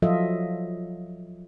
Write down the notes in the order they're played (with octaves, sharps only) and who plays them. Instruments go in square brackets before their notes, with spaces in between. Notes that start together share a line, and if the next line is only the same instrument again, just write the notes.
[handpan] F3 F#3 F4 A4 D#5 E5